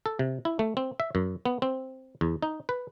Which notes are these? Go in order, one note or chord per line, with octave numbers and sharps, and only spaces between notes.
A4
C3
E4
A3
C4
E5
F#2
B3
C4
E2
D#4
B4